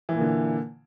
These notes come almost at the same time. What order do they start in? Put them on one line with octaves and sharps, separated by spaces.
E3 A#2 A#3 D3